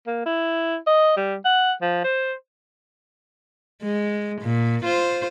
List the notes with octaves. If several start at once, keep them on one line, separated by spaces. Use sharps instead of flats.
A#3
E4
D#5
G3
F#5
F3
C5
G#3
A#2
F4 C5